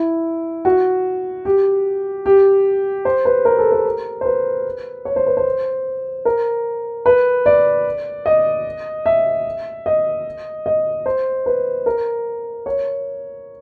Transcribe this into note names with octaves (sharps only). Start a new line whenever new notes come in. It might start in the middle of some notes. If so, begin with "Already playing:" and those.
Already playing: E4
F#4
G4
G4
C5
B4
A#4
A4
A#4
C5
B4
C#5
C5
B4
C5
A#4
B4
D5
D#5
E5
D#5
D#5
C5
B4
A#4
C#5